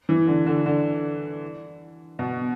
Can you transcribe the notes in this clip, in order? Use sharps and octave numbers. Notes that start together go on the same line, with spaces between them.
E3
D3
D3
D3
B2